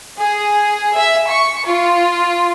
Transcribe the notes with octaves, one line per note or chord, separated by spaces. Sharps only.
G#4
E5
C#6
F4